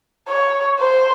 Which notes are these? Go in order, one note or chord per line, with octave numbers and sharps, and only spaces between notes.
C#5
C5